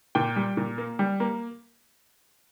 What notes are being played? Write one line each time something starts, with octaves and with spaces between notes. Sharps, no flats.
A#2 G5
G3
A#2
A#3
G3
A#3